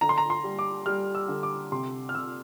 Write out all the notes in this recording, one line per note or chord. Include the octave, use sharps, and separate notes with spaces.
D3 A#5
C6
A#5
C6
G3
D6
G3 F6
E6
D3
D6
C3 C6
F6
C3 E6